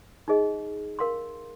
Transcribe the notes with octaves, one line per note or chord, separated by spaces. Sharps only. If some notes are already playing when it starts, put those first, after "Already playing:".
D#4 G#4 D#5
A#4 F5 C6